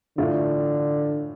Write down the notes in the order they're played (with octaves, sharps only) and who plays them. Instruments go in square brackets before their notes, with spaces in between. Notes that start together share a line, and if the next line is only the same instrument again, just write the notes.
[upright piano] A2 E3 A3 D4 F4 [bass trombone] D3